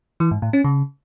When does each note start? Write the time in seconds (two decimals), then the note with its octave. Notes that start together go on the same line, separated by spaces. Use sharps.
0.20 E3
0.31 G#2
0.42 A2
0.53 C#4
0.64 C#3